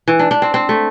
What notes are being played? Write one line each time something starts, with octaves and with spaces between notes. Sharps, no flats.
E3
D4
D4
C4
C4
A3